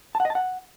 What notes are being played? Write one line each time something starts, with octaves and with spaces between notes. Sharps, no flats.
A5
F#5
D#5
A5
F#5